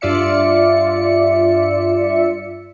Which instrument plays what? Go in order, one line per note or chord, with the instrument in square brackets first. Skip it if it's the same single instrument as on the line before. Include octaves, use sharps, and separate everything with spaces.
[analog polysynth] G2 F4 D5 E5 C#7